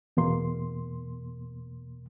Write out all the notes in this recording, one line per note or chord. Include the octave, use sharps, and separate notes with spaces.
E2 B2 A#3 C6